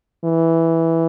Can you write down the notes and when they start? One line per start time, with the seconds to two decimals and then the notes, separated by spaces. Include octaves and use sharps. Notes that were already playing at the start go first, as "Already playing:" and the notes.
0.25 E3